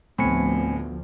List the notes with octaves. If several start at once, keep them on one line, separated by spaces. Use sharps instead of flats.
D2 A2 F3 B3 C4 G#5 C#7